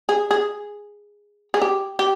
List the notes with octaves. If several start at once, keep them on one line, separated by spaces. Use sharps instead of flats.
G#4
G#4
G#4
G4
G4